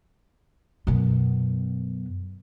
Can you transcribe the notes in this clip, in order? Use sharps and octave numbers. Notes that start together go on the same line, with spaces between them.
F#2 B2